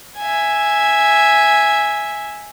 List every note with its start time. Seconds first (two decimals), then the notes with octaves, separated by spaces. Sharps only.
0.18 E5 G#5